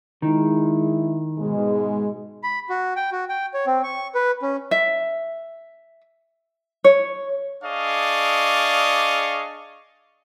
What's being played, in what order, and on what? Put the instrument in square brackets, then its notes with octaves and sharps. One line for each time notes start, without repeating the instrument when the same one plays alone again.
[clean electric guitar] D#3 [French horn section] G#3 E4
[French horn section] G#2 B2 G#3
[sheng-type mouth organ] B5
F#4
G5
F#4
G5
C#5
C4
C#6
B4
C#4
[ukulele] E5
C#5
[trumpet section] D4 G#4 D5 D#5 F5 C#6